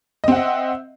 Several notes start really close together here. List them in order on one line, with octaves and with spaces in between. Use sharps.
D#5 C4 F#5 E5